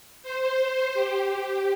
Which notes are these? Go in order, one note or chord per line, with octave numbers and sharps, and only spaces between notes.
C5
G4